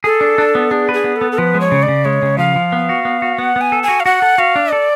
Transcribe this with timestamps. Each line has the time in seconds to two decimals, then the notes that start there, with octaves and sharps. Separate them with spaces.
0.04 G#4 A4
0.21 D4
0.38 D4
0.55 B3
0.71 D4 G#4
0.89 B4
0.94 G#4
1.04 B3
1.16 A4
1.21 B3
1.32 A4
1.38 F3 B4
1.54 G#3
1.61 C#5
1.72 C#3
1.83 D5
1.88 C#3
2.05 G#3 C#5
2.22 C#3
2.38 F3 F5
2.56 F3
2.72 B3
2.89 F#4
3.05 B3
3.22 F#4
3.38 B3 F#5
3.56 B3
3.61 G#5
3.72 A4
3.83 G#5
3.88 F#4
4.00 F5
4.05 F#4 F#5
4.22 A4
4.38 F#4 F5
4.56 D4
4.72 A4 D5